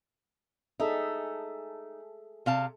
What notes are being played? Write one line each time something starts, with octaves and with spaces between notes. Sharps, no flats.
D#4 G#4 A4 E5
C3 F5 A5